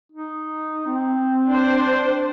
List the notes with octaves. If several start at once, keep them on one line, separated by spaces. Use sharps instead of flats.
D#4
C4
D4 C5